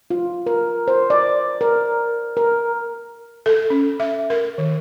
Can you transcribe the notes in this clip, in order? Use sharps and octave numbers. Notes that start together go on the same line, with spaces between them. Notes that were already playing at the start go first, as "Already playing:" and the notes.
F4
A#4
C5
D5
A#4
A#4
A4
C#4
E5
A#4
D#3